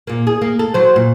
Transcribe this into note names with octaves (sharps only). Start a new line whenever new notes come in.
A#2 A#3
G#4
A#3
A4
F#3 C5
A#2